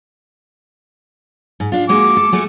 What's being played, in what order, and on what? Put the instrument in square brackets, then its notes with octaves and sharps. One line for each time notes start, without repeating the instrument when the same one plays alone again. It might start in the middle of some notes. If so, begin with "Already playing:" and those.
[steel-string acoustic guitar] G#2
D4 F4
[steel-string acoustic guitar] G#3 A#3 F#4 [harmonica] D6
[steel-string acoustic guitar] A4
G#3 A3 F#4